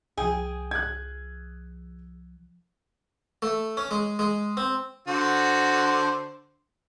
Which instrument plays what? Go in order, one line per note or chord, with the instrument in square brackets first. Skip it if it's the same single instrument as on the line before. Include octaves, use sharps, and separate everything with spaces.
[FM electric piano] C2 F3 [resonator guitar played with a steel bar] G#4 [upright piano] G5 G#5
[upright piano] F#6 G#6
[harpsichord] A3
C#4
G#3
G#3
C4
[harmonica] D3 F#4 C5